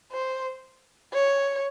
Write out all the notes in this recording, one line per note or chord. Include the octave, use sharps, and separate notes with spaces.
C5
C#5